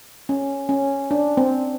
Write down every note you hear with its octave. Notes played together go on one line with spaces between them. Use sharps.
C#4
C#4
D4
C4